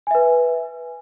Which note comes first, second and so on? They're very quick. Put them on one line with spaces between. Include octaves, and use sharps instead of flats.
G#5 E5 B4